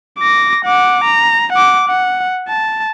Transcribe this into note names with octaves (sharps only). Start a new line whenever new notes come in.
D6 A#6
F#5 D6
A#5
F#5 D6
F#5
A5